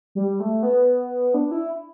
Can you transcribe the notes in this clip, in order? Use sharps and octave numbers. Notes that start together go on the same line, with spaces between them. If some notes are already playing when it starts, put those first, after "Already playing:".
G3
A3
B3
D4
E4